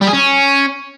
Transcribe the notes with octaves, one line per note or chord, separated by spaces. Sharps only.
G3
G#4
C#4